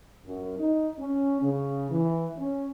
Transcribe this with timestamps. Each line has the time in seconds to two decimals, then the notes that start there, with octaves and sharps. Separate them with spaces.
0.26 F#2
0.58 D#4
1.00 C#4
1.43 C#3
1.91 E3
2.38 C#4